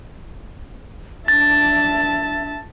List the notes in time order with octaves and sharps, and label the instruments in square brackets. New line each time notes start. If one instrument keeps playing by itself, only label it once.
[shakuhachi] D4 [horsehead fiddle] E5 A5 [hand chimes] A6